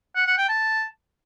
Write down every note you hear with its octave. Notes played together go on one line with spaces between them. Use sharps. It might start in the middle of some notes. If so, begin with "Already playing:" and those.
F#5
F#5
G5
A5